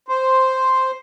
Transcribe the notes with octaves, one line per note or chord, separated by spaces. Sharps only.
C5